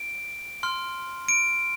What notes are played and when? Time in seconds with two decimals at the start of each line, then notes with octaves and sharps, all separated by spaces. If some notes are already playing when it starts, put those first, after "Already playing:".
Already playing: D7
0.63 C6 F6
1.29 D7